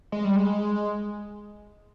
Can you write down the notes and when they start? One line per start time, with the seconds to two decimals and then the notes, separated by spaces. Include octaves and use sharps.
0.12 G#3
0.25 G3
0.36 G#3